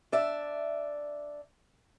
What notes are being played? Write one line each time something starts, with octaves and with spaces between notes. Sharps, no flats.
D4 D5 E5